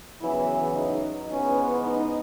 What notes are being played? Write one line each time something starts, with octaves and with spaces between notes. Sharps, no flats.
E2 C#3 E3 F#3 B3 E4
D#4
G#2 E3 B3 C#4
D#4